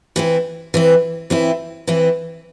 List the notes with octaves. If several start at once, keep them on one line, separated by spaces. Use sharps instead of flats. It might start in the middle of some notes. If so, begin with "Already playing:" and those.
E3 C4 E4
E3 C4 E4
E3 C4 E4
E3 C4 E4